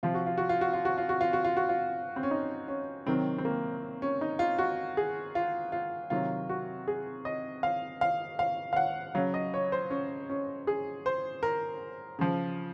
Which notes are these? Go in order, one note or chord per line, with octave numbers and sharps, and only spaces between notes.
C3 F3 F4
F#4
F4
F#4
F4
F#4
F4
F#4
F4
F#4
F4
F#4
F4
F#4
F4
C4
C#4
D#4
C#4
C3 D#3 F#3 C4
C4
A#3
C#4
D#4
F4
F#4
G#4
F4
F4
C3 D#3 F#3 F4
F#4
G#4
D#5
F5
F5
F5
F5
F#5
C#3 F#3 F5
D#5
C#5
C5
C#4
C#4
G#4
C5
A#4
C#3 F3